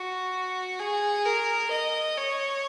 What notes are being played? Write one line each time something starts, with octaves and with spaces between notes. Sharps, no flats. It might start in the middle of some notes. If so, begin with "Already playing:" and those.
Already playing: F#4
G#4
A#4
D#5
C#5